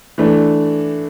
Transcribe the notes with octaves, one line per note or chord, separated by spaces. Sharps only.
E3 A3 D4